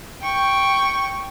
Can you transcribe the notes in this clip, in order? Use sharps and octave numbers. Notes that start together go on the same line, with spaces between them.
G5 C#6